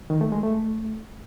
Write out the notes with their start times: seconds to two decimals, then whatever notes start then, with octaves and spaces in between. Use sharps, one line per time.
0.10 D#3
0.21 A3
0.32 G#3
0.43 A3